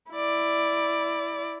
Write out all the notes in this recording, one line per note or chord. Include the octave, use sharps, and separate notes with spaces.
E4 D5